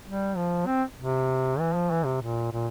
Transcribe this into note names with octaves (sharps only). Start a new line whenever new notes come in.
G3
F3
C4
C3
E3
F3
E3
C3
A#2
A#2